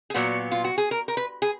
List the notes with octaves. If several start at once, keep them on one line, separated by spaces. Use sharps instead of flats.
G#4
A#2 F#3 B3 F#4
F4
F#4
G#4
A#4
A#4
B4
G#4